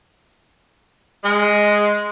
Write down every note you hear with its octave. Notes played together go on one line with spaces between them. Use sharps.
G#3